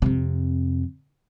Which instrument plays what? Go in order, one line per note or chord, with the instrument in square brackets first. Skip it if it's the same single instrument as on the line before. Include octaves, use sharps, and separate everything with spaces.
[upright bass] F2 C3